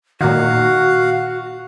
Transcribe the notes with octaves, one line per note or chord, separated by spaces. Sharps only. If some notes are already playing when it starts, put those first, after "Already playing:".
A#2 D#3 F#4 F5 F#5